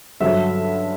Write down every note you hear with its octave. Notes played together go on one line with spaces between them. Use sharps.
G2 D3 F#3 E5